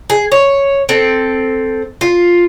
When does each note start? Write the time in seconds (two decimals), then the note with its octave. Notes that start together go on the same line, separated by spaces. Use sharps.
0.10 G#4
0.32 C#5
0.89 C4 A4
2.01 F4